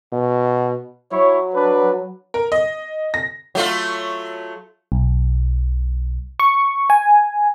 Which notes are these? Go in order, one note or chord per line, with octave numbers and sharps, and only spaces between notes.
B2
F#3 E4 C#5
D4 B4
A#4
D#5
A#6
F#3 A3 F4
B1
C#6
G#5